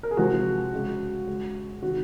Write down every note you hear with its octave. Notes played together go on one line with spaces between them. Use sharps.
A#4
G#4
C3 F3 G#3 F#4
C#3 G#3
C#3 G#3
C3 D#3 G#3 F#4